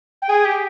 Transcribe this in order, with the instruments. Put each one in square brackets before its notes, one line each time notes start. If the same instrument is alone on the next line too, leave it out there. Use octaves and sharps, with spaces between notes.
[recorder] G5
[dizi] G#4 [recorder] G#5
[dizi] G4 [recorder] G5